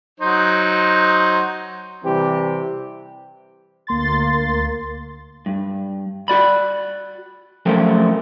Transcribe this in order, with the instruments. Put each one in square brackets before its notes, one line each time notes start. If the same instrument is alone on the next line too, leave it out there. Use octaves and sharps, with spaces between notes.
[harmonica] F#3 D#4 C5
[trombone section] C3 E3 G3 C4 G4
[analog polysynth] D2 A#3 C6 A6
[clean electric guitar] G2
F#4 D5 B5
F3 F#3 A3 C#4 A#4 C5